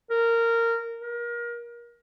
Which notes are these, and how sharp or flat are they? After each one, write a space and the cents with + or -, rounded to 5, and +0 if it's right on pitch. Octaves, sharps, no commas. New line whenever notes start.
A#4 -15
A#4 +30